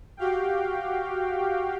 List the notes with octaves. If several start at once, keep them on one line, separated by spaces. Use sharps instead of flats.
F#4 G4 F5 G5